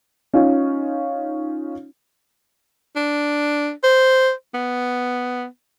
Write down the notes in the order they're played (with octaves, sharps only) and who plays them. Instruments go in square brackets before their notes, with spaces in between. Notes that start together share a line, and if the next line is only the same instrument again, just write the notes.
[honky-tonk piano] C#4 D#4 F4
[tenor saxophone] D4
C5
B3